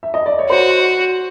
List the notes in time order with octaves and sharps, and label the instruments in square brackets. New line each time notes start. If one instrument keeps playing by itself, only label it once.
[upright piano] E5
D#5
D5
C#5
[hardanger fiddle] F#4 [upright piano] C5